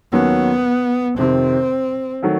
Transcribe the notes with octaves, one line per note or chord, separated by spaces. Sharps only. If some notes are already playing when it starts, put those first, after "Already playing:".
D#2 D#3 F#3 A#3 B3 C#4
F2 C3 D#3 C4
D#3 F#3 A3